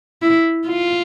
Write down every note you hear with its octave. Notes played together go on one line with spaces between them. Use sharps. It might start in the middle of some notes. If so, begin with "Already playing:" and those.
E4
F4